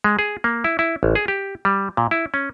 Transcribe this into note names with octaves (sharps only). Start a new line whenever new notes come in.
G#3
G#4
A#3
E4
E4
A1
G#4
G4
G3
A#2
E4
C#4